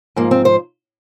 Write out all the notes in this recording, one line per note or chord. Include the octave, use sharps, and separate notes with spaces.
G#2 F3 A#3
C4
C5